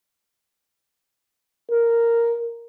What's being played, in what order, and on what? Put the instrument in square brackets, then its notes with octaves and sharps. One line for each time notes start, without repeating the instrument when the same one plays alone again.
[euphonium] A#4